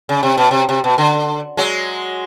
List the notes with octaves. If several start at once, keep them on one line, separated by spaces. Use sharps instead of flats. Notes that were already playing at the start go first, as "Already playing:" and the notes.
C#3
C3
B2
C3
C3
B2
D3
F#3 G#3